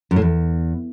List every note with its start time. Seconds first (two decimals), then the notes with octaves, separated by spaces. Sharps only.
0.11 F#2
0.16 A2
0.22 E2